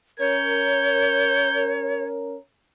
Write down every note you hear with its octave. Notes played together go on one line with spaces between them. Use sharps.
C#4 A#4 C#5 G6